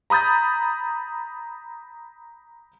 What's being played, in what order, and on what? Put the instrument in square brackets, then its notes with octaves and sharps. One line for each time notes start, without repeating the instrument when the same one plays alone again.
[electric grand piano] A#5 B5 D#6 G6 A6